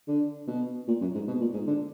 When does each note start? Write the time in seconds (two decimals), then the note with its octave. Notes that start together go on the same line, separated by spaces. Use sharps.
0.08 D3
0.47 B2
0.87 A#2
1.01 F#2
1.14 G#2
1.27 B2
1.40 A#2
1.53 G#2
1.66 D3